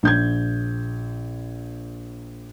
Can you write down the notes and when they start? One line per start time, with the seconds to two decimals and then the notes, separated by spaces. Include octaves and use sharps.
0.03 A#1 G6 G#6